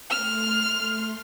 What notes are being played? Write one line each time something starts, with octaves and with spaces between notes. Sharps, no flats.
A3 C6 F6